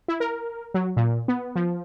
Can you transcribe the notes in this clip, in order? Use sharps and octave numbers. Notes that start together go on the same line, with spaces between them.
E4
A#4
F#3
A#2
B3
F3